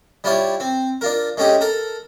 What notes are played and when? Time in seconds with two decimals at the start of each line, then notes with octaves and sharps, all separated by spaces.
0.24 G3 E4 F4 C#5 D5
0.60 C4
1.01 D4 F4 A#4
1.37 G#3 A3 C#4 G4 G#4
1.61 A4 A#4 A#5